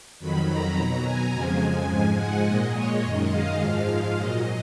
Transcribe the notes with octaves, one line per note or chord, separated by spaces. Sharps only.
F2 D#3 F#3 B5
A#5
B2 F#3
G#5
F2 C#3 F3 G#3
G#5
G#2 F3 G#3
F#5
A#2 G#3 D#5
C#5
F#2 D#3 G#3 D#5
F5
G#2 F3 G#3
A#2 F#3 D#5